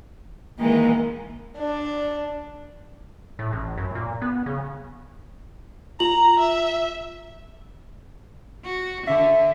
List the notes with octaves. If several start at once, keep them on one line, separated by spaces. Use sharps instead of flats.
D#3 E3 G#3 A#3
D4
A2
A1
F#2
A#2
B3
C#3
F4 A#5 F#7
E5
F#4
D3 E5